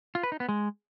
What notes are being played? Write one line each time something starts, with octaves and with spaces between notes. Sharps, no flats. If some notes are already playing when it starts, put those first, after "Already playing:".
F4
B4
D#4
B3
G#3